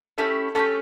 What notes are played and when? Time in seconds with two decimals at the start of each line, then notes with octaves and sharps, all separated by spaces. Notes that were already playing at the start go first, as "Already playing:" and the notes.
0.18 A3 C#4 E4 G4 A4
0.55 A3 C#4 E4 G4 A4